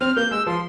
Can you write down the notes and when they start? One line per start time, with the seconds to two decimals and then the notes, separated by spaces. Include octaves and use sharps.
0.01 C4 F6
0.16 A#3 G6
0.31 G#3 E6
0.46 F3 C6